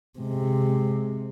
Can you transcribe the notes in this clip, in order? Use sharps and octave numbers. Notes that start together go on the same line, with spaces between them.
C3 G#3